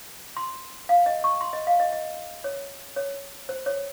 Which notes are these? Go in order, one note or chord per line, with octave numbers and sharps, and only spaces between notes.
C6
F5
D#5
C#6
C6
D#5
F5
D#5
D#5
C#5
C#5
C5
C#5